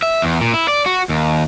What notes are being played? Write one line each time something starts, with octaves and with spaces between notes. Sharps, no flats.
E5
E2
A#2
E4
D5
F#4
D#2